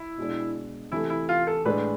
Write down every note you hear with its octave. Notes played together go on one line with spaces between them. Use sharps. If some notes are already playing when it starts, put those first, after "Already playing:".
Already playing: E4
B2 G#3 D4
C3 E3 A3 E4
E4
F4
A4
A2 G#3 D4 B4